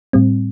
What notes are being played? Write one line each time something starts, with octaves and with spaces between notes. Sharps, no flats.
A2 G3 C4